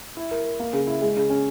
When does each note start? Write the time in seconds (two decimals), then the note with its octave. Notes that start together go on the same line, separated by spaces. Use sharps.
0.17 E4
0.31 A#4
0.45 A#4
0.60 A#3
0.73 C#3
0.87 E4
1.02 G#3
1.16 C#3
1.30 C#4